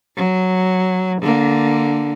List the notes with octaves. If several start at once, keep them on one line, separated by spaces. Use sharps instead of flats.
F#3
D3 A#3